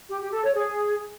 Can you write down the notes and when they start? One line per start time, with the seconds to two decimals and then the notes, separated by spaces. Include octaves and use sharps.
0.10 G4
0.21 G4
0.32 A4
0.44 C#5
0.55 G#4